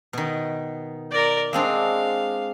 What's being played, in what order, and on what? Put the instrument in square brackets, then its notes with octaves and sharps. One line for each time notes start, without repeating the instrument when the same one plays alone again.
[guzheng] B2 D#3
[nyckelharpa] A#4 D5
[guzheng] G#3 C4 D4 [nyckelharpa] F5